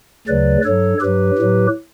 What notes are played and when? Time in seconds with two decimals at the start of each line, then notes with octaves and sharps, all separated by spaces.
0.27 D2 C#3 F#3 B4 D5
0.64 G2 F#3 A4 C#5
1.01 G2 F#3 G4 B4
1.38 A2 F#3